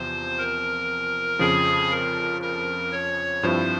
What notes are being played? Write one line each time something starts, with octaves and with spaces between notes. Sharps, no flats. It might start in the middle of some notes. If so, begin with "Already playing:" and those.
Already playing: E2 C3 F3 C5
A#4
F2 C#3 F3 G#4
A#4
A#4
C#5
G2 F3 C4 E4 C5